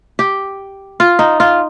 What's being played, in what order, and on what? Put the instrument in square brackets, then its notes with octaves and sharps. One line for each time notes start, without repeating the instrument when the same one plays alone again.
[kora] G4
F4
D#4
F4